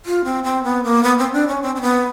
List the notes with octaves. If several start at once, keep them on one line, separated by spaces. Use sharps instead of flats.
F4
C4
C4
B3
A#3
B3
C4
D4
C#4
C4
C4
B3